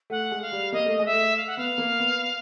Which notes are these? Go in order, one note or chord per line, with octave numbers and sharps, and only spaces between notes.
A3 F#5
G#3
F5
G3
A#3 D#5
A3
G#3 D#5
E5
A3
F5
F#5
B3 F5
A#3
B3